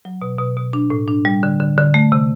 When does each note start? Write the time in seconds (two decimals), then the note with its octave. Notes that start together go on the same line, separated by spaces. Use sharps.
0.05 F#3
0.22 B2
0.39 B2
0.57 B2
0.73 D4
0.90 A2
1.08 D4
1.25 G3
1.43 D3
1.60 D3
1.78 D3
1.94 A3
2.12 C3